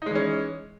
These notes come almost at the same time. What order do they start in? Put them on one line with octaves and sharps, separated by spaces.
D#4 G#3 E3 C#4